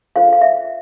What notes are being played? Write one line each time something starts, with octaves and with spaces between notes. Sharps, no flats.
D4 F4 A4 C5 F5
F5
E5